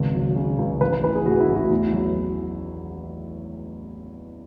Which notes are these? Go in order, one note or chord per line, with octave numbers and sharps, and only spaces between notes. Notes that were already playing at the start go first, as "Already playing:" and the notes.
Already playing: G#1 C#2
F#3
C#3
C#2
A1 B4
B4
E3 B4
G#4
A2 F#4
E4
A1
F#4
E2 E4
F#3